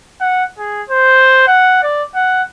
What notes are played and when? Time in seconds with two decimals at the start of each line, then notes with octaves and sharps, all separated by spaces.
0.21 F#5
0.58 G#4
0.89 C5
1.47 F#5
1.83 D5
2.15 F#5